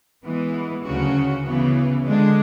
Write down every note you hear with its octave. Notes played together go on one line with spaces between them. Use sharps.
E3 G#3 B3
D2 C#3 F#3 C#4 F#4
C#3 E3 B3
D3 G#3 D4